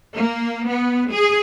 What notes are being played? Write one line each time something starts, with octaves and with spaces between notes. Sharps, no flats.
A#3
B3
G#4